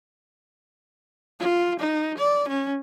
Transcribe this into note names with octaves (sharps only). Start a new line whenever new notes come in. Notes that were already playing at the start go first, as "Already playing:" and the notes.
F4
D#4
D5
C#4